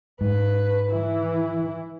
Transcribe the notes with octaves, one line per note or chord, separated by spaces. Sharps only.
G#2 B4
E3 E4